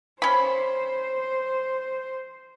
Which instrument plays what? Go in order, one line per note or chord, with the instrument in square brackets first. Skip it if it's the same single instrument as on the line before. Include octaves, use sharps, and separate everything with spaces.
[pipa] C#4 B5 [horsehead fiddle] C5